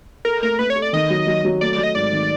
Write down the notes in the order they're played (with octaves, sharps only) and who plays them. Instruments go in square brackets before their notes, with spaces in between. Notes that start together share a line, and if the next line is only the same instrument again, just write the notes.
[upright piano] A4 [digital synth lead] A#4
[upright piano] A3 [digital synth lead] A#4
[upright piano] A3 [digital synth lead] B4
[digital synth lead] C#5
[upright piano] A4
[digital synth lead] D5
[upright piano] D#3 [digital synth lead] D#5
[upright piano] F#3
F#3
F#3
[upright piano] A3 [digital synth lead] D5
[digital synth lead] D5
[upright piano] F#3
[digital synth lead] D#5
[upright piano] G#2 [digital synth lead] D5
[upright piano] D#3